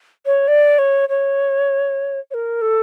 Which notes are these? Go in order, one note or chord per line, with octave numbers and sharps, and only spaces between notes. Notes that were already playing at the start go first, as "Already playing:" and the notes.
C#5
D5
C#5
C#5
C#5
A#4
A4